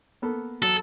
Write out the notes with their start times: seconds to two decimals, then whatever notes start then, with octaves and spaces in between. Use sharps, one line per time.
0.22 A#3 B3 A4
0.62 F#3 A4